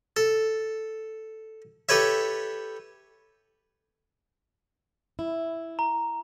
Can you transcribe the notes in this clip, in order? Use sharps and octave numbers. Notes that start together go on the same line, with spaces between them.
A4
G4 A4 B4 C#5 E5
E4
A#5